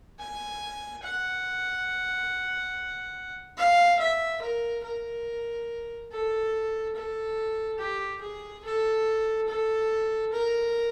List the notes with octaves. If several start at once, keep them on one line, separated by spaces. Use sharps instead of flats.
G#5
F#5
F5
E5
A#4
A#4
A4
A4
G4
G#4
A4
A4
A#4